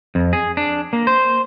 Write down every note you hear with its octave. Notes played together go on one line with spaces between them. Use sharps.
F2
G#4
D4
A#3
C5